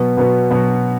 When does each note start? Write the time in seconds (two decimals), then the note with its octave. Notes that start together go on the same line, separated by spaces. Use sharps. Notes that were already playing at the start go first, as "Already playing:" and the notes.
Already playing: B2 F#3 B3
0.17 B2 F#3 B3
0.50 B2 F#3